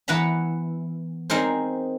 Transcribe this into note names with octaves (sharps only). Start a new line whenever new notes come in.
E3 B3 B4 F#5 A#5 B5
C4 D#4 G#4 A#4 C5